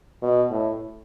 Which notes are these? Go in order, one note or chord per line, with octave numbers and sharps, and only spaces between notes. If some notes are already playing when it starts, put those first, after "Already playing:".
B2
A2